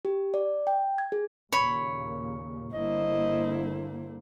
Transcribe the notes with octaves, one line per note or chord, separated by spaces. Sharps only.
G4
D5
G5
G#6
G#4
D#2 A#2 C#3 C#5 B5
G1 D3 A#3 E4 C5 D#5